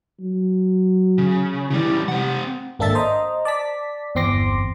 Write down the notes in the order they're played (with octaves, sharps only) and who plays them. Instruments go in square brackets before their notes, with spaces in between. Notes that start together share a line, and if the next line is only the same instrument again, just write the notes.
[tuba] F#3
[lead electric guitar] C#3
[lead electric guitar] C#3 G3 [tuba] E3
[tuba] C3 [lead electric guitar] C4 F#5
[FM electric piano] G#1 A#3 D4 A4 E5 A6
C5 D#5 A#5
D5 A5 B6
G1 E2 C4 C6 D6 A#6